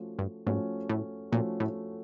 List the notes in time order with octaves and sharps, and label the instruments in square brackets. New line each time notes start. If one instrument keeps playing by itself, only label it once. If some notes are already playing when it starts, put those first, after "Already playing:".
Already playing: [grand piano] F3 A3 C#4 F#4
[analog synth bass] G2
[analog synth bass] G#2 [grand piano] F3 A3 C#4 F#4
[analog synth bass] A2
[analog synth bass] A#2 [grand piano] F3 A3 C#4 F#4
[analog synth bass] A2